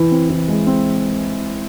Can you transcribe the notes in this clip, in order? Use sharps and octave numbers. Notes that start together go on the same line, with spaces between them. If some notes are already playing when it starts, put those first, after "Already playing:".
Already playing: E3 E4
C4
E3
G#3
C4